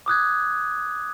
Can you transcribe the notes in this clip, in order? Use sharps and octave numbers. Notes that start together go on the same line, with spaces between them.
D6 D#6 F#6 G#6